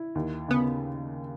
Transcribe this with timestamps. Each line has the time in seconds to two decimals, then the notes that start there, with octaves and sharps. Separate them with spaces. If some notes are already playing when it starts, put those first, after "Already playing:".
Already playing: E4
0.15 D#2
0.48 C#3 B3